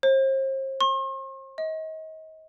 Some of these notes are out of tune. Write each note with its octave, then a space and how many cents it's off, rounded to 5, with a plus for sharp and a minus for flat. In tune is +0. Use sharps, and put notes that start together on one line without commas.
C5 +40
C6 +45
D#5 +35